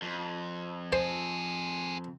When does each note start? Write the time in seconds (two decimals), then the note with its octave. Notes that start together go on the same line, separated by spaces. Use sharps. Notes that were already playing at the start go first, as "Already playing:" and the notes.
0.02 F2
0.93 C4 G#4 C5